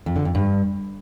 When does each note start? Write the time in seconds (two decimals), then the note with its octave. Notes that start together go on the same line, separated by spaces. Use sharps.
0.06 F2
0.16 D3
0.25 F2
0.35 G2